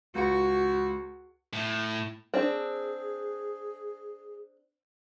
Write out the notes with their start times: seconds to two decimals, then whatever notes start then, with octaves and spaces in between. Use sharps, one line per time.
0.15 C#2 F#4 C#7
1.53 A2
2.34 C4 D4 G#4